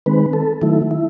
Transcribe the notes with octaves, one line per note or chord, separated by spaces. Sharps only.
D#3 G#3 C4 B4
A4
D#3 F#3 A3 E4
E4